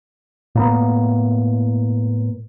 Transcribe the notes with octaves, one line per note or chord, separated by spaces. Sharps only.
A2 A#3 B3